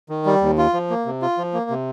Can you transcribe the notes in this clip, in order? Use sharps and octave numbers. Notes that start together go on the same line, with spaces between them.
D#3
G3
D#2
F4
F3
A#3
C3
F4
F3
A#3
C3